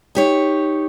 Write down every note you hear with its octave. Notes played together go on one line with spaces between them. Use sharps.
D#4 G4 C#5